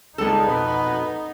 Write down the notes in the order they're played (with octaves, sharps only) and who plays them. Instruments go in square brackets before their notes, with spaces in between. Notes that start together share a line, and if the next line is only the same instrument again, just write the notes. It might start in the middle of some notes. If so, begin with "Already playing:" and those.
[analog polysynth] C#2 G3 G#3 [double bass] B3 D#4 [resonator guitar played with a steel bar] A4
[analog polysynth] F2 B2 [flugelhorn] B4